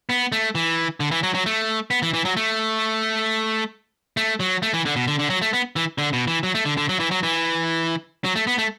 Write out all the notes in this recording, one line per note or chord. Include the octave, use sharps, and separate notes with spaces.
B3
A3
E3
D3
E3
F#3
F#3
A3
B3
E3
E3
F#3
A3
A3
F#3
A3
E3
D3
B2
D3
D3
F#3
A3
B3
E3
D3
B2
E3
F#3
A3
D3
D3
F#3
E3
F#3
E3
F#3
A3
B3
A3